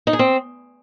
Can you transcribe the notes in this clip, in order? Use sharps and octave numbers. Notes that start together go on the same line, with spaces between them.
D#4
G#4
C4